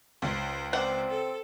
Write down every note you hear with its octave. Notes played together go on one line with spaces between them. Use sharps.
C#2 C5
C4 C5 D5 F#5
A4